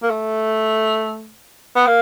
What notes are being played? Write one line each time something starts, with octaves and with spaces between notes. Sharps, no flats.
A#3
A3
B3
A#3